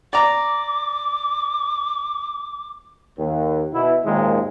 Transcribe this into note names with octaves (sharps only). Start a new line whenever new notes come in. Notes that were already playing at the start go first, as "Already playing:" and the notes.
D5 A#5 D6
D#2
B2 E4
G#1 D#2 A#2 G#3